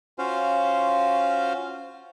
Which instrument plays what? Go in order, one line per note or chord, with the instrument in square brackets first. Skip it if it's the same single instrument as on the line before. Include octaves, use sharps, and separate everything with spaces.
[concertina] C#4 F4 F#4 C5 F5